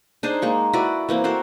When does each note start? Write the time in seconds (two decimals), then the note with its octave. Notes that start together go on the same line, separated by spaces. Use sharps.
0.23 D4 D#4 G#4 C5
0.42 G#3 A#3 C#6
0.73 E4 F#4 B4 D5
1.09 E3 A#3 C4
1.24 F#4 A4 A#4 C5